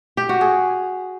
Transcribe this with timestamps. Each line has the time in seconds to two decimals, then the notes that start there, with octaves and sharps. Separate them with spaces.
0.17 G4
0.29 F#4
0.41 G#4